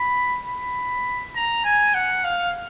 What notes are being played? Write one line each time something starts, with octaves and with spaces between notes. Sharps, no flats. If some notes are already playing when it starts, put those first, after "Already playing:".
Already playing: B5
B5
A#5
G#5
F#5
F5